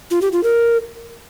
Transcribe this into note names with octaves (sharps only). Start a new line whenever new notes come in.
F4
G4
F4
A#4